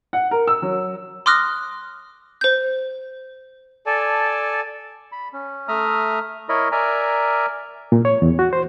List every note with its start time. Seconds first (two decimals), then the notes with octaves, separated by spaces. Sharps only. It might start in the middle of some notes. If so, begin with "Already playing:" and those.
0.13 F#5
0.31 A#4
0.47 E6
0.62 F#3
1.26 C6 D6 D#6 F6 F#6 A#6
2.41 C5 G6
3.86 A4 D5 G#5 A5
5.12 B5
5.33 C#4
5.68 A3 E5 A#5 D#6 F6
6.49 E4 A#4 C#5 D#5 B5
6.72 A#4 D5 E5 G#5 A#5
7.92 A#2
8.05 C#5
8.22 E2
8.39 F#4
8.53 C5